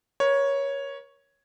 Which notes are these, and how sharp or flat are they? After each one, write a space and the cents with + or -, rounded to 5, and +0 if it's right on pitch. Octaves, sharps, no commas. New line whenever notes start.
A#4 +40 C#5 +0